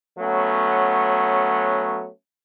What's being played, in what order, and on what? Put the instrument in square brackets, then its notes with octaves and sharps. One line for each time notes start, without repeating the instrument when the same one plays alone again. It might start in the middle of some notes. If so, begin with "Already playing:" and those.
[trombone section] F#3 A3 B3 C#4